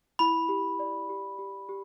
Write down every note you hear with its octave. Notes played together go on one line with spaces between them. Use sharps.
E4 B5
G4
D5
G4
G4
G4